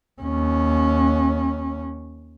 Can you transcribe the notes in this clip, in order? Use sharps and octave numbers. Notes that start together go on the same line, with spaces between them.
D#2 C#4